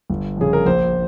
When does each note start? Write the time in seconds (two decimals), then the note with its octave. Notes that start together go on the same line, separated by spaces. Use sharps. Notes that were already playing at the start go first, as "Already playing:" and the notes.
0.10 G1
0.37 F2 C#3 G#4
0.53 A#4
0.66 A#1 C5